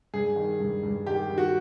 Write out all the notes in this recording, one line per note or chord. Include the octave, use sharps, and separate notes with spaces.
G2 G#4
D#3
G2
G2
D#3 G4
D#3
F#4